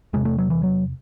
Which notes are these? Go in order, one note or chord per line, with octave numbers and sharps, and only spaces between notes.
E2 C3 G#3
A3
F#3
E3
F#3